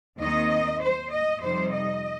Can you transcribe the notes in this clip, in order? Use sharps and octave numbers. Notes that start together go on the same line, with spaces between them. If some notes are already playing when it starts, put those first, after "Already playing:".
D#2 D#3 C4 D#4 D#5
C5
D#5
F2 C3 G3 D#4 C5
D#5